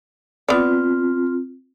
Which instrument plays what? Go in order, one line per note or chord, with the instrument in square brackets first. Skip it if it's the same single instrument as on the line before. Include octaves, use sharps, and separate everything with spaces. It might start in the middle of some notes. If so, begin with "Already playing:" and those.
[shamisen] B3 D5 [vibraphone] C4 F4